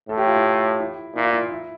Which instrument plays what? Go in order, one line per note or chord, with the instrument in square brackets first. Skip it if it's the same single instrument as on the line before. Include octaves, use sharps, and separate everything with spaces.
[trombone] A2 [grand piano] A4
[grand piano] G4
F4
E4
E4
[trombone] A#2 [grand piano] E4
[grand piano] F4
E4
E4